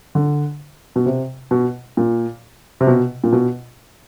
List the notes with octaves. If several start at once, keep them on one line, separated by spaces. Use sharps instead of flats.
D3
B2
C3
B2
A#2
C3
B2
A#2
B2